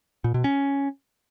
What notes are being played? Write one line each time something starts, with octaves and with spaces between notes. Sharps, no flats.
A#2
B2
C#4